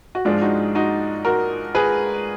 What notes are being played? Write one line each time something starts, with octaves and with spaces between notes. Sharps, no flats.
F#4
G#2 F3 G#3 D4 F4
D#4 F#4
D#4 F#4
F#4 A#4
G#4 B4